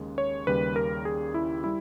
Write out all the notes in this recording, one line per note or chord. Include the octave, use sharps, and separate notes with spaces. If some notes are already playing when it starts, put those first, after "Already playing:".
Already playing: D#2 C#3 G#3
C#5
D#2 C#3 G3 B4
A#4
G#4
E4
G3 E4